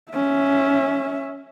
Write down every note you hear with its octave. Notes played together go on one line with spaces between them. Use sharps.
C#4 E5